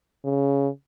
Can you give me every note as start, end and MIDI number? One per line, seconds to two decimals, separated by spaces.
0.25 0.68 49